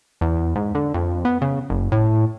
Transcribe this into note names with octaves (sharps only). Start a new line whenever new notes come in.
E2
G#2
D3
F2
B3
C#3
F#1
A2